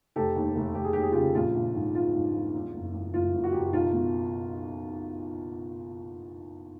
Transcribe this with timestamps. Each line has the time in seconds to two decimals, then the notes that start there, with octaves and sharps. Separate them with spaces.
0.16 F1 G4 A4
0.36 D#2
0.56 F1
0.75 F1 G4
0.84 G#4
0.93 D#2 G4
1.03 G#4
1.12 C#3 F4 G4
1.35 A#1 F4
1.55 A#1
1.74 G#2
1.95 E3 F4
2.14 G#2
2.34 E3
2.54 E2
2.74 F#1
2.94 E2
3.13 F#1 F4
3.33 F#1
3.44 F#4
3.52 F#1 G4
3.62 F#4
3.73 B1 F4
3.93 B2